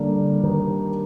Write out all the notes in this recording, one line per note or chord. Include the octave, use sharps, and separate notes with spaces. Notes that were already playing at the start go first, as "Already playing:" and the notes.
Already playing: D3 G3 A#3 D4 G4
D#3